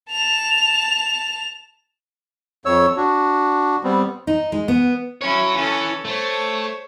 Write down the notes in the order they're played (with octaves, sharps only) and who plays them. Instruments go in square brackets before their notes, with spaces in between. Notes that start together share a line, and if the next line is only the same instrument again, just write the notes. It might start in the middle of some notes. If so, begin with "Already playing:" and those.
[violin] A5 F7
[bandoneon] F2 C#5 E6
D4 F#4
G3 B3 C4
[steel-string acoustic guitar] D#4
G#3
B3
[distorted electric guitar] F#3 C#5 [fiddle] C#4 E4
[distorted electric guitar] E3 [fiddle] C#4 A4
[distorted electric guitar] A3 [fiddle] C5 C#5